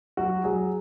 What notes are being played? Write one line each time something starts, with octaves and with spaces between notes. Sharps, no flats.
F#3 F#4
F#3 G#4